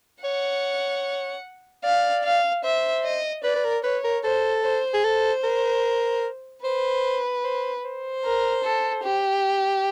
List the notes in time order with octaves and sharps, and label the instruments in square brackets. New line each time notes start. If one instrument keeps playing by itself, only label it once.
[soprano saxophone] C#5 [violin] F#5
[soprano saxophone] D5 [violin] F5
[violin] F5
[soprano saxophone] C5 [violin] E5
[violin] D#5
[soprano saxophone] B4 [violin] D5
[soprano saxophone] B4
A#4
[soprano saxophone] B4 [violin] C#5
[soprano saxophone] A#4
[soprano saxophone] A4 [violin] C5
[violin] C5
[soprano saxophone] G#4
[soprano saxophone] A4 [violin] C5
[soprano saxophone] A#4
[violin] B4 [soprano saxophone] C5
[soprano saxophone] C5
C5
[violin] A#4
A4
G4